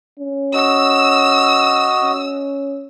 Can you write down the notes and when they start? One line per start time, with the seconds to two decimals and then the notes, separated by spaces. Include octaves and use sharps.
0.19 C#4
0.54 F#4 D#5 E6
2.03 C#4